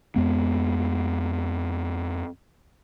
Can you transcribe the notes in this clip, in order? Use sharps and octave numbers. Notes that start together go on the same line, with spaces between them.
F2 G#3 B3